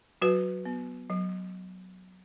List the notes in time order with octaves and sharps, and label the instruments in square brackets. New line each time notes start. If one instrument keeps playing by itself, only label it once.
[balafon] F#3 F#4 B4
B3
F#3